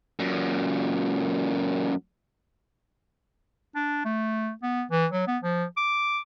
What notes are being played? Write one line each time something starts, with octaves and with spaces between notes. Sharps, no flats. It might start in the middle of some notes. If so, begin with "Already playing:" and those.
F#2 A#2
D4
A3
B3
E3
F#3
B3
F3
D6